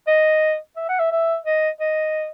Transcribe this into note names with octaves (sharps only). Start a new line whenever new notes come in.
D#5
E5
F#5
E5
E5
D#5
D#5